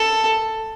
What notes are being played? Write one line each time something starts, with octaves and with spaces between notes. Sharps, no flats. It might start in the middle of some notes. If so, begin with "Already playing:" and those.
Already playing: A4